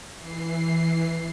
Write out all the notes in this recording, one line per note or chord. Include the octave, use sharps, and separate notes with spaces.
E3 C7